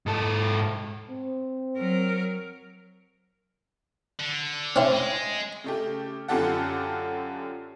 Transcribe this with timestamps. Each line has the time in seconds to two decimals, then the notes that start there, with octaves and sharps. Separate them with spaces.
0.06 G#2 A4
1.10 C4
1.77 F#3 A#4
4.19 D3
4.76 C4 C#4 E4
4.91 G#3
5.64 C#3 A3 G4
6.28 F#2 D3 F4 G4 A4 F#5